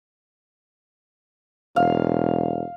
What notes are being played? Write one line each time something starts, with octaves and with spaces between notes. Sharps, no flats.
E1 F5